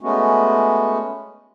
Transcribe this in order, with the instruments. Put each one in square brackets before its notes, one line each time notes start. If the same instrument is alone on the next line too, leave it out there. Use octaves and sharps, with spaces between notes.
[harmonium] G#3 A3 B3 C#4 F#4